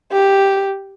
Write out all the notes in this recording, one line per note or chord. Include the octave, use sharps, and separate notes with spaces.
G4